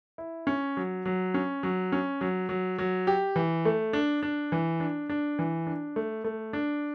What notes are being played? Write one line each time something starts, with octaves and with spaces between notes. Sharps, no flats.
E4
C#4
F#3
F#3
C#4
F#3
C#4
F#3
F#3
F#3
G4
E3
A3
D4
D4
E3
D4
D4
E3
D4
A3
A3
D4